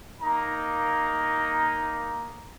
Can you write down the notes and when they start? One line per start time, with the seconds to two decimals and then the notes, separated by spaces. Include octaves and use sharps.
0.22 A#3 D#4 A#5